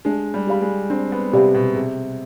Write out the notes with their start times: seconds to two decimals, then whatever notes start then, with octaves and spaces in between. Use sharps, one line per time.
0.05 G#3 D4
0.34 G3
0.47 G4 D5 F5 B5
0.61 G#3
0.90 C4 D4
1.12 B3
1.33 C3 G4 D5 F5 B5
1.55 B2
1.75 C3 G#4